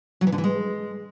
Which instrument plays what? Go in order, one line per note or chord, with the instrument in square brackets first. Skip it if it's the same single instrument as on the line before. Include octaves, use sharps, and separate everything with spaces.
[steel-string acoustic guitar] F#3
E3
D3
E3
G#3